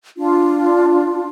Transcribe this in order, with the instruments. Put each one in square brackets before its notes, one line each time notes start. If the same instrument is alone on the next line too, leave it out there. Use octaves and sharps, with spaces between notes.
[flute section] D4 F4